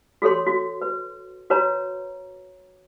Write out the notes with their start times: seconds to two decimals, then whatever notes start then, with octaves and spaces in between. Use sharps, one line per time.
0.22 F#4 G#4 A4 C#5 C6
0.47 F#4
0.81 B4
1.50 F#4 B4 C#5 A#5